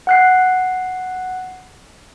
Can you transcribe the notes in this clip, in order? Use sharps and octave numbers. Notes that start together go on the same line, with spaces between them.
F#5 F#6 C7